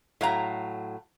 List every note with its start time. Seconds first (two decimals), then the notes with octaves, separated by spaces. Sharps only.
0.21 A2 F#3 F5 A#5